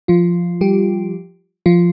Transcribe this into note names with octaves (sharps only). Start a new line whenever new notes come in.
F3 F4
G3 G4
F3 F4